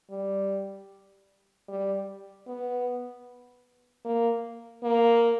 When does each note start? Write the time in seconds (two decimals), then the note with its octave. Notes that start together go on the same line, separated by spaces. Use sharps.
0.10 G3
1.68 G3
2.47 B3
4.05 A#3
4.83 A#3